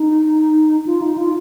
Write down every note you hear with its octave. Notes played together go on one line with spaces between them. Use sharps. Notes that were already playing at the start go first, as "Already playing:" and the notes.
Already playing: D#4
F4
D#4
F4